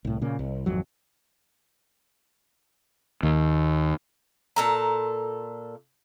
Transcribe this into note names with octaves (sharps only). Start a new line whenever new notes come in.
C2 A2
A#2 C#3 A#3
C2
G#1 F2 F#3
D#2
A#2 A4 A#5